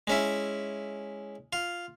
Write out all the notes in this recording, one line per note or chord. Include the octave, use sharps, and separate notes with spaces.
G#3 C#4 E4
F4